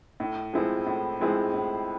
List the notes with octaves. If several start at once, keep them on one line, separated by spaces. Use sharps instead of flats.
A2
F3 G#3 C4 E4
A2
F3 G#3 C4 E4
A2